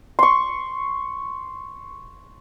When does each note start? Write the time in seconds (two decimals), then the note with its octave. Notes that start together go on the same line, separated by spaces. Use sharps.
0.19 C6 C#6